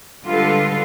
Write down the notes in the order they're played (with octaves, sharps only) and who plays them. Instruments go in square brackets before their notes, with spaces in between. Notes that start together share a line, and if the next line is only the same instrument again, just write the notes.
[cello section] D3 G3 G#3 F4 A4 B4